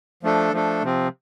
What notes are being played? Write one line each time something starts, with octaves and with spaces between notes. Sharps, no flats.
F3 A3 D4 A4
F3 A3 D4 A4
C3 F3 C4